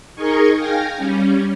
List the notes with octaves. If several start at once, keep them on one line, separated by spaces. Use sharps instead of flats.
D#4 G#4 A#4 D#5 G#5 C#6
F5 G5 G#5 A#6
G3 C#4